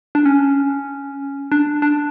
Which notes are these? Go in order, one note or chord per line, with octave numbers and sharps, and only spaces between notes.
D4
C#4
D4
D4